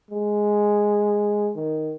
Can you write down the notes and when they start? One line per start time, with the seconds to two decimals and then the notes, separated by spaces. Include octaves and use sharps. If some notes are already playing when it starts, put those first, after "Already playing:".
0.11 G#3
1.56 D#3